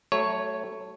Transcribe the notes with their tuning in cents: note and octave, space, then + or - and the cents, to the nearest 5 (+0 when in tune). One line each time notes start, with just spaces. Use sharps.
F#3 +40 A3 +0 C#5 +0